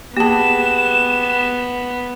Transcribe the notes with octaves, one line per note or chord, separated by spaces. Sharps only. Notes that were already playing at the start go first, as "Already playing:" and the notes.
A#3 B3 G4 G#4 A5 E7